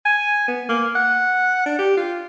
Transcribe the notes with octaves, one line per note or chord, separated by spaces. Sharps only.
G#5
B3
A#3
F#5
D4
G4
F4